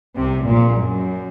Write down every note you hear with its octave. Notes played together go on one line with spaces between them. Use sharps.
C2 C3
A#1 A#2
F#2